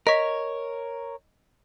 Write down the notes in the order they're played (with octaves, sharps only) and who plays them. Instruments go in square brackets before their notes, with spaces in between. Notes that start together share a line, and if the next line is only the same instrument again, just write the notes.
[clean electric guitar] A#4 C#5 [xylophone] D#5 B6